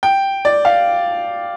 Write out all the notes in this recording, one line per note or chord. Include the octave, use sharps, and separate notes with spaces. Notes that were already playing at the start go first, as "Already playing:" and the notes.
G5
D5
F5